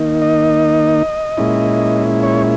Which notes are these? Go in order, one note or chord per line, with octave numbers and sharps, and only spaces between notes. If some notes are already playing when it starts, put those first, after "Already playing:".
Already playing: D#3 A#3 D#4
D#5
A#2 G#3 C#4 E4
C#5